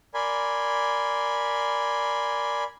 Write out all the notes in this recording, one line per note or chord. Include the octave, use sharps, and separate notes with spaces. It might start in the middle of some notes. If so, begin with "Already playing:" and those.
A#4 D5 G#5 B5 C6